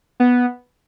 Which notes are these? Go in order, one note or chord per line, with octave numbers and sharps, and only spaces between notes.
B3